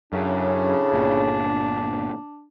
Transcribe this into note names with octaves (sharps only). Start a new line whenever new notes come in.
F#2 A2 C#3 D4
G1 A#2